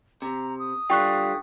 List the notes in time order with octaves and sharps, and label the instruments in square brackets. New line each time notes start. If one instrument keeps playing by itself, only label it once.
[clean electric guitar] C3 [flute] A#5
[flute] D#6
[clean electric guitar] D3 G3 F4 [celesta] G5 C#6 F#6